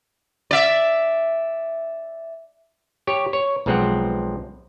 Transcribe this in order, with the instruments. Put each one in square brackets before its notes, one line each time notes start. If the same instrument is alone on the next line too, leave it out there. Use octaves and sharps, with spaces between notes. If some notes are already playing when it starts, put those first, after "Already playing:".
[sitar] D5 E5
[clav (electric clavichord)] G4 C#5
C#5
B1 F3 G#3 C4 G4 F#5